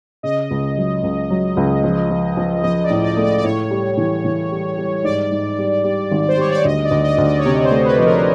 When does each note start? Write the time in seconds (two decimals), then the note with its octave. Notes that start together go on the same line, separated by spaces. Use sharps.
0.23 C#3 D#5
0.51 C#2
0.77 F#3
1.03 C#2
1.30 F#3
1.57 C#2
1.84 F3
2.10 F3
2.37 F3
2.63 F3 D#5
2.84 D5
2.90 A2
3.04 D5
3.17 A3
3.24 D5
3.38 D5
3.44 A2 C#5
3.71 G3
3.97 E3
4.25 E3
4.51 G3
4.78 G3
5.04 G#2 D5
5.31 G#2
5.58 G3
5.84 G3
6.11 G#1
6.28 C5
6.37 G3 C#5
6.52 D5
6.65 D2 D#5
6.85 D5
6.91 D2
7.04 D#5
7.18 D2
7.25 D5
7.39 C#5
7.45 C3 D5
7.65 C5
7.71 A3
7.85 B4
7.98 F3
8.05 A#4